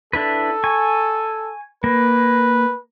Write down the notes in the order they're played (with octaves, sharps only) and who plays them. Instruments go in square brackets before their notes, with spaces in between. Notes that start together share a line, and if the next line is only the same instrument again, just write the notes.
[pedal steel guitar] D4 E4 B4 [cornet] A4
[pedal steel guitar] G#5 C#6
[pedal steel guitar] A#3 [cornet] B4